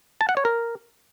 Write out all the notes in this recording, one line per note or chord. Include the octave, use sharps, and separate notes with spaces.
A5
F#5
C#5
A#4